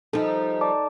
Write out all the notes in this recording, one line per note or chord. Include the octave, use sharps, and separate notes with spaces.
F3 G3 D#4 A4
D5 A5 D6